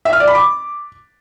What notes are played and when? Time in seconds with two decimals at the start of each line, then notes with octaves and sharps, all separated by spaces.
0.05 E5
0.13 F6
0.20 D5
0.27 B5
0.35 D6